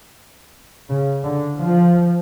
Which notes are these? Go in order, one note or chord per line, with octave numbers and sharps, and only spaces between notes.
C#3
D3
F3